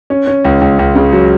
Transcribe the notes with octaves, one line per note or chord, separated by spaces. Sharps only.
C#4
C#4
C#2
C#2
C#2
C#3
F#3